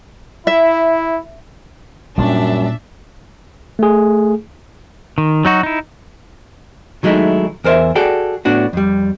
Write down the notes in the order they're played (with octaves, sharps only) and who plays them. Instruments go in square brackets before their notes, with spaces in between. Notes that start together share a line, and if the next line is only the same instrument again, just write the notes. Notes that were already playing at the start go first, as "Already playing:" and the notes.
[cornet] E4 [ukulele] E5
[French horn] F#2 [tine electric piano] A#2 [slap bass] G3 G#3 C#4 [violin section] D4 E5
[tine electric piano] A3 G#4
[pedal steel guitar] D#3
F#3 D#4 F#4
D#4 E4
[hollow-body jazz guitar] D#3 F#3 G#3 A3 D#4 E4
E2 A#4 C5 D5 E5
F#4 G#4 A4 D5 G5
A2 B3 D4 F#4
F2 G3